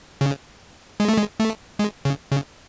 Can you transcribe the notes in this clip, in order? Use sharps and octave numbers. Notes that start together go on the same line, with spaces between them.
C#3
G#3
A3
G#3
A3
G#3
C#3
C#3